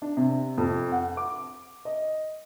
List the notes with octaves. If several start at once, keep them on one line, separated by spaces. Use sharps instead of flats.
D4
C3
F2
F#5
D6
D#5